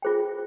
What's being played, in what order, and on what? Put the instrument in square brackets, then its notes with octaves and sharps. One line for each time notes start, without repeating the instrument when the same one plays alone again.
[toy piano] F4 G#4 C5 G5